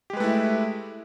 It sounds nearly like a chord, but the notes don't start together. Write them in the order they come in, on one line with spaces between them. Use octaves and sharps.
G4 G#3 B4 A3 E4